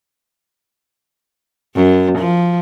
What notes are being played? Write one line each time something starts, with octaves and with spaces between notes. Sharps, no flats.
F#2
F3